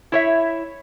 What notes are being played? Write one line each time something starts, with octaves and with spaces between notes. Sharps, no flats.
E4 C#5 E5